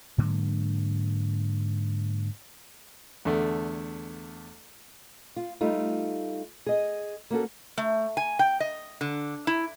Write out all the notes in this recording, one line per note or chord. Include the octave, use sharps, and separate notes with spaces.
G#2 D3 F#3 A#3
E2 D3 A3
F4
G3 A3 D#4 F4
G#4 D#5
A#3 C#4 F#4 A4
A3
G#5
G5
D#5
D3
E4